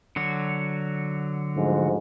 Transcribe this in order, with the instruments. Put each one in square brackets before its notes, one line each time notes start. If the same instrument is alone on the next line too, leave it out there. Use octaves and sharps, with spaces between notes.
[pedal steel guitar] D3 F#3 F#4
[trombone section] D2 G#2 F3